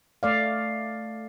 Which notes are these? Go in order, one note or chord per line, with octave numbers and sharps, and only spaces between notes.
A3 D5 F5